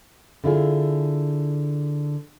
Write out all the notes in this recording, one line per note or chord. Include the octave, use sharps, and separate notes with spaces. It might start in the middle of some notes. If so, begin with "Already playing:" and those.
D3 E4 F4 G#4